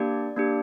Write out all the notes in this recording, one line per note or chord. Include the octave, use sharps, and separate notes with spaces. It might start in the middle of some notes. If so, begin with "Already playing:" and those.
Already playing: A#3 D4 G4 D5
A#3 D4 G4